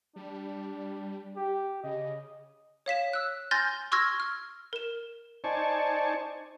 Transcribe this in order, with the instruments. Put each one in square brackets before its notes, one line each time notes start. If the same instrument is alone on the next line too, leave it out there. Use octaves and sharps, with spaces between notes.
[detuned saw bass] G3 [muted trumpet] D4
[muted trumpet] G4
[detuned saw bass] C#3 [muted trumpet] D#5
[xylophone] C#5 F5 B6 E7
E6 F#6
G#5 C6 F6 G6 A6 A#6
C6 C#6 E6 F6 G#6 A#6
F6
A#4 E7
[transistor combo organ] D#4 C5 D5 G#5 A5 C#6